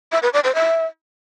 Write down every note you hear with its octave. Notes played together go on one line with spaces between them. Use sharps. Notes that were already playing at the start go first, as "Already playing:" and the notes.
E5
B4
D5
C5
E5